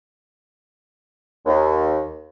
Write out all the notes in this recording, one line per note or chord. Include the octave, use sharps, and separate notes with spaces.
D#2